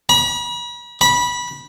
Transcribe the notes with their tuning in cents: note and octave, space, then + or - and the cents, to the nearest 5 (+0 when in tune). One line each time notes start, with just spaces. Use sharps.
B5 -40
B5 -20